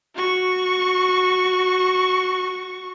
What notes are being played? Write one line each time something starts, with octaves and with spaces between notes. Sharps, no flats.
F#4 C#6